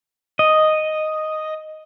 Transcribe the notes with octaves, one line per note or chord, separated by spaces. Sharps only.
D#5